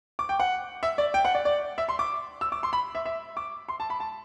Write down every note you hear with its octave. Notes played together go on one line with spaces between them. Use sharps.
D6
G5
F#5
E5
D5
G5
F#5
D5
D5
E5
C6
D6
E6
D6
C6
B5
E5
E5
D6
C6
A5
B5
A5